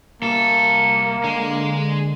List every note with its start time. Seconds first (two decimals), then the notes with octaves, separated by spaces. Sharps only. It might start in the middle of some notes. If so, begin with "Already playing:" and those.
0.22 C2 A#3 A4
1.24 D3 G#3